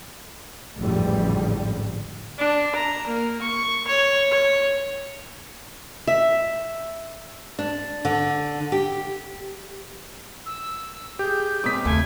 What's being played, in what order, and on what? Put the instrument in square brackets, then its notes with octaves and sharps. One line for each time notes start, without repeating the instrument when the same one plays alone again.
[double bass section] A1 F2 G#2 D3 F3 G3
[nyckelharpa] D4
A#5
A#3
C#6
C#5
C#5
[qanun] E5
[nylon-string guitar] D4
D3
G4
[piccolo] E6
[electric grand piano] G4 G#4 [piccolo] G6
[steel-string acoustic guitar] G#2 C4 C#4 [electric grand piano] D6 D#6 B6
[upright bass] D#2 E3 [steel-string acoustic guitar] C#3 A3 [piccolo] G#5